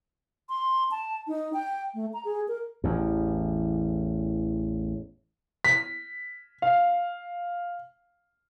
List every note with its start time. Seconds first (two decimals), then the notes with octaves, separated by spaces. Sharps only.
0.49 C6
0.91 A5
1.28 D#4
1.53 G5
1.94 A3
2.13 A#5
2.25 G#4
2.48 A#4
2.84 A1 E2
5.65 B6
6.62 F5